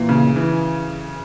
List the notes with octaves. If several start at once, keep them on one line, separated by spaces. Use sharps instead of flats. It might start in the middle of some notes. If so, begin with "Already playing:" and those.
Already playing: A#2 E3
C#3
E3